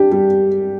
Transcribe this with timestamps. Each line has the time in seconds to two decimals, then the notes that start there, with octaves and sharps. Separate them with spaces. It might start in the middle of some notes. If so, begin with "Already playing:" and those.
Already playing: D4 G4
0.11 G3